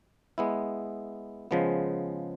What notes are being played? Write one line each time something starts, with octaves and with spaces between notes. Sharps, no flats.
G#3 B3 E4
C#3 F3 G#3 B3